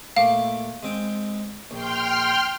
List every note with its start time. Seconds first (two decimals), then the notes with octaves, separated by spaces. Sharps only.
0.17 A#2 A3 F5 D6
0.83 G#3 C4 G5
1.71 A#1 G5 C6 F6